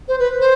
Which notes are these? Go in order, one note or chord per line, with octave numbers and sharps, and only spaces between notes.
C5
B4
C5